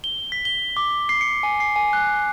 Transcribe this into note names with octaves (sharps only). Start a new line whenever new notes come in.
G7
B6
G7
D6
C7
C#7
G#5
C7
G#5
F#6